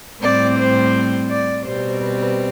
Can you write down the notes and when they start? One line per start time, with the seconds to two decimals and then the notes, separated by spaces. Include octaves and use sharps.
0.22 A2 G3 C4 D5
0.57 C5
1.29 D5
1.64 B2 G3 C4 C5
2.00 B4